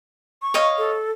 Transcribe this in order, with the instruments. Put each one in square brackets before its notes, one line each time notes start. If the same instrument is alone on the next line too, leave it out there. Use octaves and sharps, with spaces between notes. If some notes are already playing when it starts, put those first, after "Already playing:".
[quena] C#6
[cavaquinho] C#5 D#5 F5
[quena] A4